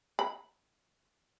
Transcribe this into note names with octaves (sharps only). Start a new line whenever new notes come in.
B5